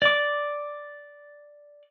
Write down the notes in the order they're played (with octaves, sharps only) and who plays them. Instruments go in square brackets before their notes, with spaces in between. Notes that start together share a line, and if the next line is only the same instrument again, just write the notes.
[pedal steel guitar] D5 D6